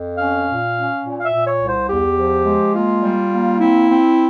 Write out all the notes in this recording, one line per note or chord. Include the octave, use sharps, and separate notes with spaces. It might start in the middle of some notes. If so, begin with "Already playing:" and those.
Already playing: F2
C#4 F5
A#2
C#4
A#2
F5
E5
A#2
C#5
C2
C5
E2 G4
F3
G#3
A#3 F4
G3
A#3
C4 E4
C4